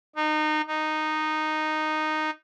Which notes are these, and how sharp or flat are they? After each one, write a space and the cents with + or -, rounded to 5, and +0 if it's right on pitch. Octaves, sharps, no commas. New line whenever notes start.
D#4 -25
D#4 -10